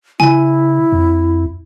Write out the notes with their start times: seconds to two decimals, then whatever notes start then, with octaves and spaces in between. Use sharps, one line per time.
0.20 C#3 E4 G#5
0.92 F2